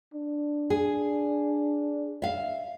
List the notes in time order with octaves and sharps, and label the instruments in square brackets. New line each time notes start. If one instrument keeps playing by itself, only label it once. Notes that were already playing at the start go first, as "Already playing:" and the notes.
[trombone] D4
[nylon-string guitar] G#4
E5 F5